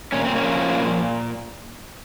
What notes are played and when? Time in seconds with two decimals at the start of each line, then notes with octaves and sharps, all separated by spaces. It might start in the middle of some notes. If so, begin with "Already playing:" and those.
0.12 A#2 C#4
0.24 C4
0.35 A#3 C#4
0.42 F3
0.73 A#2